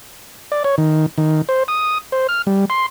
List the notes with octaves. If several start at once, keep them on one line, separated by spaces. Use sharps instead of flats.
D5
C#5
D#3
D#3
C5
D#6
C5
F6
G3
C6